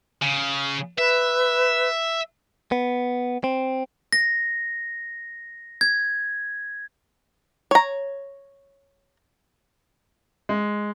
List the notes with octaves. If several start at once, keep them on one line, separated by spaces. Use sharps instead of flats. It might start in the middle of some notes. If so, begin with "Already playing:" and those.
C#3
B4 E5
B3
C4
A#6
G#6
C#5 A#5
G#3